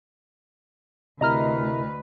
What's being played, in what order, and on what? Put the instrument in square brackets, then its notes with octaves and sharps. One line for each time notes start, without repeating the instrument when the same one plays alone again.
[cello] D2 B4 [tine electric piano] C3 E4 A#4 [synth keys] D#5 A#5 F6